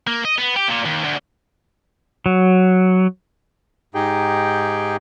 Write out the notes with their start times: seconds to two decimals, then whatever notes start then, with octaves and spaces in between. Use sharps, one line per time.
0.07 A#3
0.25 D#5
0.38 B3
0.56 G4
0.69 A#2
0.86 D#2
1.04 D2
2.26 F#3
3.95 G#2 D#4 G4 G#4 G5